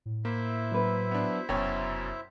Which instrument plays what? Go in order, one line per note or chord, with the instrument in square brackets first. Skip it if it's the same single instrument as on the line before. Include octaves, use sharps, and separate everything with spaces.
[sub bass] A2
[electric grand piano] A#3 [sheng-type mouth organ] E4 C5 E5
[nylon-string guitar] F#3 B4
[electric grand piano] B3 D4
[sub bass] F1 [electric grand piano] F#2 B2 C#5 [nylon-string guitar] G5